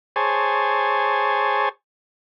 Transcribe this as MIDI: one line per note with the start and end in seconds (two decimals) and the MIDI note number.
0.16 1.69 68
0.16 1.69 72
0.16 1.69 73
0.16 1.69 80
0.16 1.69 81